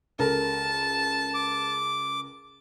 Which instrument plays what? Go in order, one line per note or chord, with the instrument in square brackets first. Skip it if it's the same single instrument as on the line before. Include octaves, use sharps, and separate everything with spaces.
[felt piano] C#2 A4 A#4 [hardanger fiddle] A5
[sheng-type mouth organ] D6